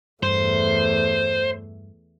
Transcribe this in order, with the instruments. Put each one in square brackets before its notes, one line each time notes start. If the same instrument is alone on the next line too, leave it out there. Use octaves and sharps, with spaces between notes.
[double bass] E2 A3 [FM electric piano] G2 [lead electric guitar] C5